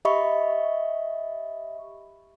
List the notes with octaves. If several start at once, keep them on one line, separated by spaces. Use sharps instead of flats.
G4 D#5 E5 B5 C#6